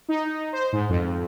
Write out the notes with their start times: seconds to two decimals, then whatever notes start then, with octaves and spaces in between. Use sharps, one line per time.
0.09 D#4
0.53 C5
0.73 G#2
0.89 F2